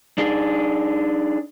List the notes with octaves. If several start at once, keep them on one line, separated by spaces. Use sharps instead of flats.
D4 D#4 G#4